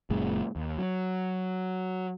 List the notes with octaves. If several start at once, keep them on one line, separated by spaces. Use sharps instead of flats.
F#1 F#2 A#2 G#3
D#2
F#3